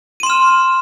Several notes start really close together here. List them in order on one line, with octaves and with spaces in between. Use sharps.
D#7 C6 E7 F6